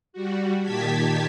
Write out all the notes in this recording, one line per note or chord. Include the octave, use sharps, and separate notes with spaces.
G3 F#4
A#2 D#3 G4 A5 G#6 B6